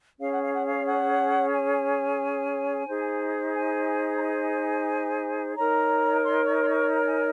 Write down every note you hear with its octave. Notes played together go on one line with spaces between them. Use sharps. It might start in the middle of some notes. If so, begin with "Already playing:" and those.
C#4 G#4 C#5 F5
F#5
F5
F#5
F5
F#5
G#5
D#4 G#4 C5
G#5
A#5
G#5
D#4 A#4 C#5 A#5
C6
C#6
C6
C#6
A#5
G#5